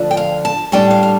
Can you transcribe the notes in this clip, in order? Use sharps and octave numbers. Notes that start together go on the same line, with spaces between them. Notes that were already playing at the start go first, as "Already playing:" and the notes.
Already playing: D2 D3 F3 D4
G5
F5
A5
A2 G3 D4 G5
F5
F5